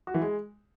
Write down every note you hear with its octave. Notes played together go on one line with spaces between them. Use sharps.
F#4
E3
G#3